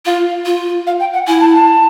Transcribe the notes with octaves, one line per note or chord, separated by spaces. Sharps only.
F4 F5
F4
F5
G5
F#5
E4 G#5
A5
A5